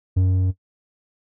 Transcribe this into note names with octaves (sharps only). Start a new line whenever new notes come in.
F#2